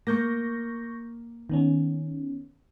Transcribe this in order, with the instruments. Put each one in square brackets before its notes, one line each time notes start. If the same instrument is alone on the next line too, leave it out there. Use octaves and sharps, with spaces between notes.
[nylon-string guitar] A#3 [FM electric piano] C#6 G6 A#6
[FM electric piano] D#3 B3 C#4